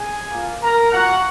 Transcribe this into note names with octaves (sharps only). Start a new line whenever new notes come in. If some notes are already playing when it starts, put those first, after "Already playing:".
Already playing: G#4 G#5
A#3 F4
A#4 A#5
A#3 F4 F#4 F#5